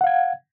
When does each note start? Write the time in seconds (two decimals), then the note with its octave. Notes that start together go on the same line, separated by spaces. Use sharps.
0.01 F#5
0.04 F5
0.07 G#6